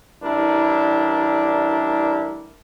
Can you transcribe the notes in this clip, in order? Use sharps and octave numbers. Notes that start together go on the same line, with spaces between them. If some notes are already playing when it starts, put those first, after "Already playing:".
A1 G3 D4 E4 A#4